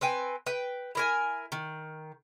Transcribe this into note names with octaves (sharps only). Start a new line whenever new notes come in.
C4 B4 G5 G#5
B4 G5
E4 A#4 G#5
D#3